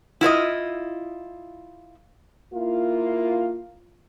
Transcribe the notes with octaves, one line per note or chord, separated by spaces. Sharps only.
E4 F4 C5 D#5
A#3 E4 F4